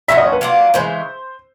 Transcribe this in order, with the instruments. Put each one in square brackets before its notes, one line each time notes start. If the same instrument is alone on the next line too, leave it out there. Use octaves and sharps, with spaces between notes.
[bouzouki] F3 A3 C#4 F#4 [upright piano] E5
[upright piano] D#5
C#5
B4
[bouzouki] F#3 A#3 D4 F4
[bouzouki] C#3 E3 G#3 [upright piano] C5